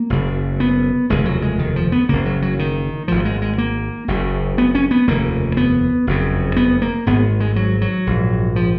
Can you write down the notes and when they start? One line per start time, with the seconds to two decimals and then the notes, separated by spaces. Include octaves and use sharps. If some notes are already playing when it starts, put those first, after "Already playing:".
Already playing: A#3
0.10 F#1 F#2 C#3
0.60 B3
1.09 F1 D#2 C#3 G#3
1.25 F#3
1.42 G#3
1.59 D#3
1.76 F3
1.92 B3
2.09 F#1 F#2 C#3 A#3
2.26 F#3
2.42 F#3
2.59 D#3
3.08 G#1 G#2 F3
3.25 G#3
3.42 G#3
3.58 A#3
4.08 F#1 F#2 C#3
4.58 B3
4.75 C#4
4.91 B3
5.07 F1 D#2 C#3 A#3
5.57 B3
6.07 F#1 F2 C#3
6.56 B3
6.82 A#3
7.06 G#1 G#2 B3
7.40 G#3
7.56 F#3
7.81 F#3
8.07 A#1 G#2
8.56 F3